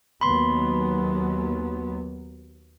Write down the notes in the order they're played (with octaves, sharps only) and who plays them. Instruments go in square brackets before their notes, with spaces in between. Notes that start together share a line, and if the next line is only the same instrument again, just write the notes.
[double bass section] D#2 F#3 B3 [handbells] B5 C6